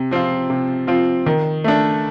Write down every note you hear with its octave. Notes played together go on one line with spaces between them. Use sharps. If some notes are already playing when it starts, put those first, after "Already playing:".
Already playing: C3
F3 C4 F4
C3
F3 C4 F4
D#3
A3 D4